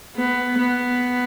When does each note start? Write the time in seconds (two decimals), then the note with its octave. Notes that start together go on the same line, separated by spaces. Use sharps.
0.16 B3
0.58 B3